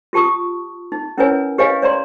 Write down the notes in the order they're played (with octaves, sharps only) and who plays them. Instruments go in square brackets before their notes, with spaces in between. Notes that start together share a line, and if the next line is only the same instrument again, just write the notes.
[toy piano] F4 G4 A5 C#6 D#6
D#4
C#4 E4 A#4 B4 C#5 G#5
G4 B4 C#5 D#5 F5 G#5
C#5 D5 A#5 C6